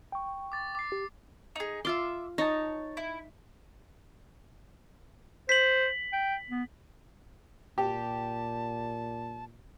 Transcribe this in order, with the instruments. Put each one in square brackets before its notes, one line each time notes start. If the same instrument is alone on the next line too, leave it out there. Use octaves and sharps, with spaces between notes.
[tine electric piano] G5 C#6
[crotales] D6 A6
D6 C7
[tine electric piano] G4
[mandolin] D#4 G#4
[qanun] F4 C6 [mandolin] E5 D6
[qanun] D#4 [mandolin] C#5 A5
[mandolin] E4
[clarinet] C5 [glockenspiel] B6 F#7
[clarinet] G5
B3
[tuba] A#2 [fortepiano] G4 [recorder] A5